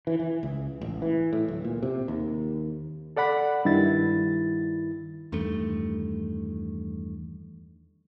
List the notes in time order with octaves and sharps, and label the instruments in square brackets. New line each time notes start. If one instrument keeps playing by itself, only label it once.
[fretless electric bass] E3
E3
C#2
A1
E3
A2
D1
A#2
C3
D#2
[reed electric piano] A4 D5 F#5 B5
G2 D#3 E4 A6
[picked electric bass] E2 G2 D#3 A3